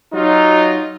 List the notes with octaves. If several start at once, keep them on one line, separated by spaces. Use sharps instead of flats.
F#3 D#4 F4